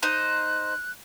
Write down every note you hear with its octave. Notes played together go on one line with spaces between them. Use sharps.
D#4 C5 F#6